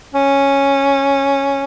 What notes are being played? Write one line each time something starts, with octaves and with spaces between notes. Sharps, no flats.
C#4